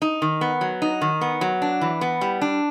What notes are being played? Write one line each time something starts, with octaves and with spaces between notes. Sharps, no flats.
D#4
D#3
B3
F#3
D#4
D#3
B3
F#3
D4
E3
B3
G3
D4